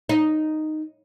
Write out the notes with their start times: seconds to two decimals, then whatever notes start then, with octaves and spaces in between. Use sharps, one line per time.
0.09 D#4